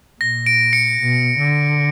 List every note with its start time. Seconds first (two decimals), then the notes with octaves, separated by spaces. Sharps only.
0.21 A#2 A#6
0.46 D7
0.73 C#7
0.99 B2
1.39 D3